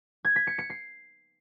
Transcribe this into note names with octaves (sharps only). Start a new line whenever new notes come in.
G#6
B6
C#7
C#7
C7